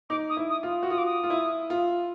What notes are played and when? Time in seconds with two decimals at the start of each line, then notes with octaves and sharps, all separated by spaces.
0.10 D#4 D6
0.29 D#6
0.37 E4
0.50 D#6
0.63 F4
0.83 F#4
0.90 F4 D#6
0.98 D6
1.06 D#6
1.24 F4
1.30 E4
1.70 F4